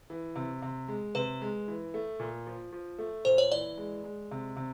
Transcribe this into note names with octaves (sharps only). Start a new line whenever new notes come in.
E3
C3
C3
G#3
C3 B4
G#3
E3
A3
A#2
F3
F3
A3
A#2 C5
C#5
E3 D5
G#3
G#3
C3
C3